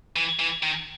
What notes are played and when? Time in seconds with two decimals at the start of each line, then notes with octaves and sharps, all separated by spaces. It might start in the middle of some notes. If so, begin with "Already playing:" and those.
0.16 E3
0.39 E3
0.63 D#3